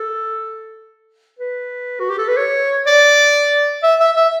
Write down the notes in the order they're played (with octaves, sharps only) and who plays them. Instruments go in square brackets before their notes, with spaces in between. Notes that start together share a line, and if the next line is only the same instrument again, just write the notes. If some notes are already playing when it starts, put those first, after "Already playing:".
Already playing: [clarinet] A4
B4
F#4
G4
A4
B4
C#5
D5
E5
E5
E5